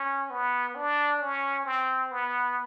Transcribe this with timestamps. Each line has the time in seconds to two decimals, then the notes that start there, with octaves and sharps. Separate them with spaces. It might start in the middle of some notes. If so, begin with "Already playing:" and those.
Already playing: C#4
0.30 B3
0.75 D4
1.21 C#4
1.66 C4
2.12 B3